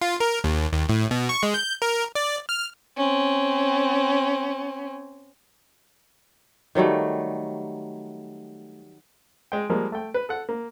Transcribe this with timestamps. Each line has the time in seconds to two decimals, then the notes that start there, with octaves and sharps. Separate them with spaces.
0.01 F4
0.20 A#4
0.44 D#2
0.73 D#2
0.89 A2
1.11 B2
1.29 C#6
1.43 G#3
1.54 G6
1.82 A#4
2.15 D5
2.49 F6
2.97 C4 C#4
6.75 D#3 F#3 G3 A3
9.52 G#3 G5
9.69 F3 G3 G#3 A#3
9.92 A3 G5
10.14 B4
10.29 A4 F#5
10.49 A#3